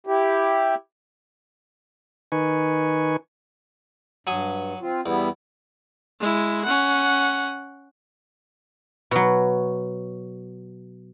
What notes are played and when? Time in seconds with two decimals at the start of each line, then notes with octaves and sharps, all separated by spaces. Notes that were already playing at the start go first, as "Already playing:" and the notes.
0.07 E4 G4
2.32 D#3 D#4 B4 G#5 C#6
4.27 G2 F#3 G#5 D#6
4.82 C4 F4
5.06 E2 G3 B3 E4
6.20 G#3 E4
6.65 C#4 F#5
9.11 B2 F#3